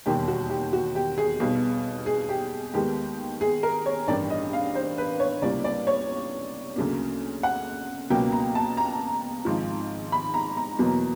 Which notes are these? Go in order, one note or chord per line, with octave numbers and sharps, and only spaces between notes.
E1 D#2 D#3 G3 G4
F#4
G4
F#4
G4
G#4
B1 B2 G3 B3
G#4
G4
D#2 D#3 G#3 B3 G4
G#4
A#4
C#5
A1 G2 D#3 D5
D#5
F5
C5
B4
C#5
C#2 C3 E3 G3 A#3 D5
D5
C#5
D2 C#3 F#3 A#3
F#5
C#2 B2 F#3 A#3 G5
A#5
A5
A#5
G#1 G#2 F3
B5
A#5
A#5
E2 B2 F#3 A#3